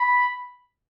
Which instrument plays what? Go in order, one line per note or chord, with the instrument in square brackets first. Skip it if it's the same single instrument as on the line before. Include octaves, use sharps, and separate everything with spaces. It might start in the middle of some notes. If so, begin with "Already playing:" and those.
Already playing: [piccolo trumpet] B5